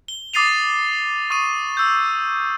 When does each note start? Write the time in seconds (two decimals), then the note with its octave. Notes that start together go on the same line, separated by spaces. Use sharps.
0.08 G7
0.34 D6 D#6 A6 C7 D#7 F7
1.30 C#6 D#6 D#7
1.77 E6 G6